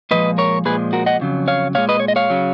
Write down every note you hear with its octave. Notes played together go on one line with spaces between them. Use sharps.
A#2 F3 G#3 B4 D#5
A#4 C#5
A#2 F3 G#3 G#4 B4
F#4 A#4
D#5 F#5
F2 C#3 F#3
C#5 F5
A#2 G#3 C#5 F5
B4 D#5
C#5
D#5
C#5 F5
C#3 F#3